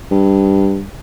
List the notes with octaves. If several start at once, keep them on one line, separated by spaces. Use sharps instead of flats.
G2